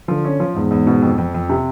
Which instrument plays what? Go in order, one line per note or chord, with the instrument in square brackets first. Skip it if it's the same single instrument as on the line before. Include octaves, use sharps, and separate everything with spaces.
[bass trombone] D3 [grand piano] F3
[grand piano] C#4
F3
[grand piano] E2 [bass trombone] G#2
[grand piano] E2
B2
F2
F2
F2
C3